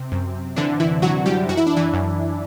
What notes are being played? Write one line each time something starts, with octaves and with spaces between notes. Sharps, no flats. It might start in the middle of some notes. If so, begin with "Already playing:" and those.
Already playing: C3 C4
F#2
D3 E3 D4
E3 E4
E3 F#3 F#4
G3 G4
F#2 F#4
E4
D4
E3 E4
F#2